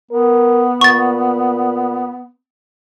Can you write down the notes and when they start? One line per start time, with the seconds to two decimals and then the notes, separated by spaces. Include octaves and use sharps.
0.11 B3 A#4
0.81 A#2 C#6 A6